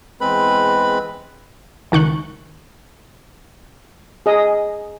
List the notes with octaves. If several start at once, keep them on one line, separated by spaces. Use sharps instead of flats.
E2 G#3 C4 B4 B5
C#2 D#3 C#6 F#6
G#4 D#5